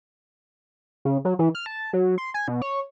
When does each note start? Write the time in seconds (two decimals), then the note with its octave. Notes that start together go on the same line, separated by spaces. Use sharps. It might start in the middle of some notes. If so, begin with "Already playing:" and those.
1.05 C#3
1.25 F#3
1.39 E3
1.55 F6
1.66 A5
1.93 F#3
2.18 C6
2.34 G#5
2.48 B2
2.62 C#5